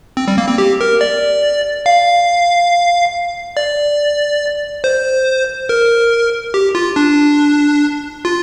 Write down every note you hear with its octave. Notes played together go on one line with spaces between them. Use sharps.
C4
G3
A#3
C4
G4
A#4
D5
F5
D5
C5
A#4
G4
F4
D4
F4